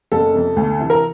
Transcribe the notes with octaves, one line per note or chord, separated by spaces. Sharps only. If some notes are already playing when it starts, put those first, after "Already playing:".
F#1 A4
F2 C3
D2
C3 E3
A#4